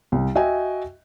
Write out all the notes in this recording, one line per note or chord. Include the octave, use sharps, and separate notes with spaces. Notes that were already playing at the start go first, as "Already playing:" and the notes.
C2
F#4 D#5 E5 G5 G#5